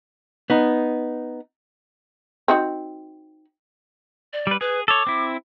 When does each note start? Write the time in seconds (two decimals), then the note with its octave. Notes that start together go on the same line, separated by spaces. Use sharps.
0.50 B3 D#4
2.48 C4 D#4 F#4
4.33 D5
4.47 G3 B4
4.61 G#4 B4
4.88 A4 C#5 D6
5.07 C4 E4